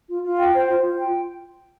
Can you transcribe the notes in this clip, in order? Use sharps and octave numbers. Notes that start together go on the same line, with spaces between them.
F4
F4
G5
C5
F4
F4
G5